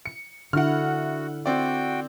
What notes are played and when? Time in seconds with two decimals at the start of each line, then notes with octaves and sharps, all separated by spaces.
0.06 C#7
0.53 D3 E4 F#4 F#5 F6
1.46 C4 F#4 D5 G5